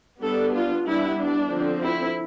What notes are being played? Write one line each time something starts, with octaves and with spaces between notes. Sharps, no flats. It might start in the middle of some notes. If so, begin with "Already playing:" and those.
G3 B3 D4 A4
F4
G3 B3 D4 E4
D4
D3 F3 C4
E4